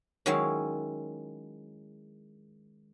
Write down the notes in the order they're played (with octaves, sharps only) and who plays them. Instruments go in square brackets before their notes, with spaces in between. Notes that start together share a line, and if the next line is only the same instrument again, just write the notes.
[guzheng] D#3 F#3 G#3 C#4 E4 F5